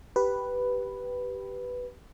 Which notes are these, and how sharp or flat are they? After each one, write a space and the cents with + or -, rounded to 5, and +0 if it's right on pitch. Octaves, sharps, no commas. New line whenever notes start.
G4 -10 B4 +0